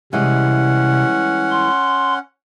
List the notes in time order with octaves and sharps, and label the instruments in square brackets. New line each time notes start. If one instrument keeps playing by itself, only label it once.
[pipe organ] C3 [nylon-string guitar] E3 G3 G#3 [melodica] C#4 F#5
[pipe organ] C6